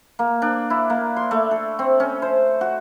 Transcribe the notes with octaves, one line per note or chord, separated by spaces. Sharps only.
A#3
D4
E4
A#3
C6
A3
A4
C4
C#4
C5
F#4